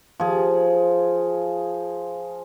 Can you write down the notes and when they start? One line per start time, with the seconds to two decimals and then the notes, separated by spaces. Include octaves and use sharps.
0.20 F3 G#4